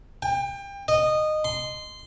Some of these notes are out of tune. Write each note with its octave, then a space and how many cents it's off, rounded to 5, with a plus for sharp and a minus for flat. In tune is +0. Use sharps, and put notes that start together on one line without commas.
G5 +30
D#5 -15
C6 -15